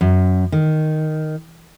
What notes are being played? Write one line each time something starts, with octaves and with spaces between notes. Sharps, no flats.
F#2
D#3